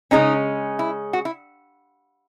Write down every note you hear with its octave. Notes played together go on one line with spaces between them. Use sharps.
C#3 G#3 C#4 D#4
E4
F#4
E4